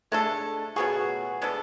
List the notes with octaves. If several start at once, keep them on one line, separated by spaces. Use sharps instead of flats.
G#3 A3 D4 A4
B2 F#3 B3 F#4 G#4
G#3 B3 D4 A4